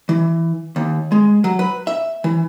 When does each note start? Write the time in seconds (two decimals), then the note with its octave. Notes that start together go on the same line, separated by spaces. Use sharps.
0.09 E3
0.76 D#2
1.12 G#3
1.44 F#3
1.59 B4
1.87 E5
2.24 E3